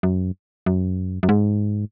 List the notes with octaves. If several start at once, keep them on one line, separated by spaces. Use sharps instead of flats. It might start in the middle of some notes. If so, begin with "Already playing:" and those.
F#2
F#2
F#2
G#2